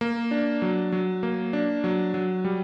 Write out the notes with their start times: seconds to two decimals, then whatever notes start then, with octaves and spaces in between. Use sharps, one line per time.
0.01 A#3
0.31 D4
0.62 F#3
0.92 F#3
1.23 A#3
1.53 D4
1.84 F#3
2.14 F#3
2.44 G3